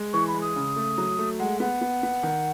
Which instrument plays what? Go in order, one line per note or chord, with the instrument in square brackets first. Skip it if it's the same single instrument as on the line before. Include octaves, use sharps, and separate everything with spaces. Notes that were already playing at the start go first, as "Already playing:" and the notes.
Already playing: [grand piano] G#3
[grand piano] E3 [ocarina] C#6
[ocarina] B5
[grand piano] G#3
[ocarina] D#6
[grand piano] C#3
A3
F#3
A3
[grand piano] G#3 [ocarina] F#5
[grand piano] B3 [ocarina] F#5
[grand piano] B3
B3
D#3